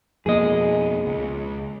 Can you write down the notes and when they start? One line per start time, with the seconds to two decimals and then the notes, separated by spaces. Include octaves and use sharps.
0.26 F2 B2 A#3 G#4 D#5
1.06 C#2